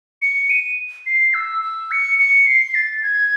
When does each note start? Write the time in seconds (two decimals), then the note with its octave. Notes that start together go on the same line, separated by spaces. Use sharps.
0.22 C#7
0.50 D#7
1.06 C7
1.34 E6
1.63 E6
1.91 C#7
2.19 C#7
2.47 C7
2.75 A6
3.03 G#6